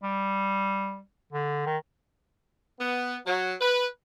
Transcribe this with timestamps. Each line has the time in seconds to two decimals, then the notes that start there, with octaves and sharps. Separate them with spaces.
0.03 G3
1.33 D3
1.66 D#3
2.80 B3
3.26 F#3
3.60 B4